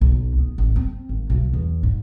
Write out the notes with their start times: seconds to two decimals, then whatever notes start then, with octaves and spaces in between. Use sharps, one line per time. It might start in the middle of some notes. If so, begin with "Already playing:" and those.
0.01 B1
0.38 B3
0.58 A1
0.76 C4
1.09 G#1
1.30 B1
1.53 E2
1.83 G#2